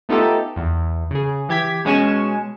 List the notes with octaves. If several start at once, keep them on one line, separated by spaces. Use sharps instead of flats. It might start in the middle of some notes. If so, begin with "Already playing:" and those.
A3 B3 D#4 F4 G4 A4
E2
C#3 G#4
E3 G4 G#6 B6
B2 G#3 C#4 G#5 C#6 E7